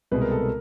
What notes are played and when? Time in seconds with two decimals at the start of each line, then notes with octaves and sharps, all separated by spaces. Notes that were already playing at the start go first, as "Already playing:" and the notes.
0.11 C2 B2 G#3 B4
0.21 A#4
0.32 A4
0.41 A#4